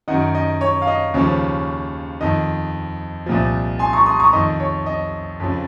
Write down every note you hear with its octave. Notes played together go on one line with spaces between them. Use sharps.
F#2 D#3 D#5 F#5
D#5
C#5
F5
D#5
D#2 C#3 F3 C#5
F2 D#3 D#5
C2 A#2 F3
G#5 C6
A#5 C#6
C6 D#6
A#5 C#6
F2 D#3 D#5
C#5
D#5
F2 C#3 F3